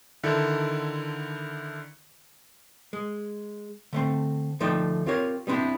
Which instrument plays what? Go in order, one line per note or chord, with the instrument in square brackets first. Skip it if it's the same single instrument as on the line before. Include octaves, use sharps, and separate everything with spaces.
[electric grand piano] D3 D#3 E4 A4
[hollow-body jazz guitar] G#3
D3 A3 C4
D2 F3 A3 D#4 D5 G5
C4 F4 G4 A#4 C#5
G3 B3 C4 D4 E4 G4